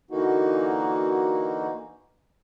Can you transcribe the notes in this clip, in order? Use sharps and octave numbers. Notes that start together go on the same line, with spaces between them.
D3 E3 A#3 D#4 F#4